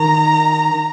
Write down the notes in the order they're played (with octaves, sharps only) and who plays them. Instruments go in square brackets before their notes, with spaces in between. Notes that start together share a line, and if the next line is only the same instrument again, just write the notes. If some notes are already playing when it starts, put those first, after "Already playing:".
Already playing: [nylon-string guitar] D#3 [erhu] A#5